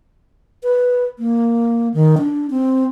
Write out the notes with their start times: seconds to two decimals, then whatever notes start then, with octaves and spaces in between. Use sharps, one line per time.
0.63 B4
1.19 A#3
1.94 D#3
2.18 D4
2.50 C4